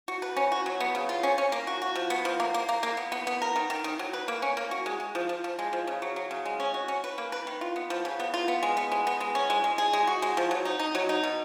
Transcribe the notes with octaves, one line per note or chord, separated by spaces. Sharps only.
F#4
B4
C#4
F#4
F#3
B3
C#3
F4
C#4
C#4
A#3
F#4
F#4
F3
B3
F3
A#3
A#3
A#3
A#3
B3
B3
B3
A#4
D#3
D#3
D#3
F#3
B4
A#3
C#4
A#3
F#4
G#3
G#3
F3
F3
F3
G#3
F3
C#3
F#3
F#3
C#3
G#3
C#4
F#4
C#4
B4
A#3
B4
D#3
F4
B3
F3
C#3
B3
F4
B3
G#3
B3
G#3
B3
G#3
C#4
G#3
G#3
G#4
G#3
F#4
G#3
F3
F#3
D#4
D#4
F#3
D#4
B2